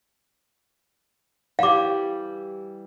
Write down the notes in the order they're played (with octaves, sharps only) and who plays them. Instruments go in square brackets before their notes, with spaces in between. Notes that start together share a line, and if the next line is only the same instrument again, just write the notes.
[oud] E3 G3 [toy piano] F5 D6